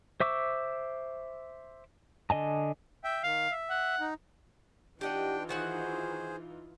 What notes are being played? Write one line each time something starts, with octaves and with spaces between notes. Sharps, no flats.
C5 E5 C#6 D6 E6
D3 D#5 G#5 A5
E5 G5
D#3 F5
E5
F#5
D#4
E3 D4 D#4 F4 G4 D#5 F#5 G5
D#3 F#4 G#4 C5 F#5